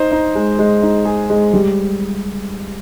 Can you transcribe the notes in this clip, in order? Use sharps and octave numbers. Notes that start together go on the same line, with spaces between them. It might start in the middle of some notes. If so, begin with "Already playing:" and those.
Already playing: D#4 C5
D#4
G#3
G#3
D#4
G#4
G#3
G3